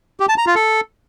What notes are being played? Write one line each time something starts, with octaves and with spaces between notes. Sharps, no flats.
G4
A5
A#5
F4
A4